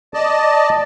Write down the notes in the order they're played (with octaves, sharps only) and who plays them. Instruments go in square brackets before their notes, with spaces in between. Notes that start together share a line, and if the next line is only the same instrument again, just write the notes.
[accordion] D5 D#5 A5